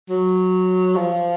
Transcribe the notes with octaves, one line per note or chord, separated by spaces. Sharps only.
F#3
F3